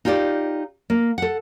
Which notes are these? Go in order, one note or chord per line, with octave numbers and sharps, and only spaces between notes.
D#4 F4 G4 C#5 D5
A#3
A4 F#5